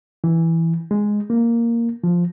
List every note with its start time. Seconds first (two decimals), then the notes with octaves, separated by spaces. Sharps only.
0.24 E3
0.91 G#3
1.30 A#3
2.04 F3